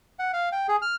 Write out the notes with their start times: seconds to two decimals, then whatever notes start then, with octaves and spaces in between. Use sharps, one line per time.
0.19 F#5
0.33 F5
0.52 G5
0.68 G#4
0.82 F6